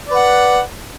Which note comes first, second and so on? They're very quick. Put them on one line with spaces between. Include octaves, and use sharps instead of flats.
D5 B4 F#5